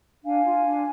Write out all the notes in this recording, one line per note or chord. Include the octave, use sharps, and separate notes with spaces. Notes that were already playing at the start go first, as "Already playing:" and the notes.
D4 F5 G#5
F4
D4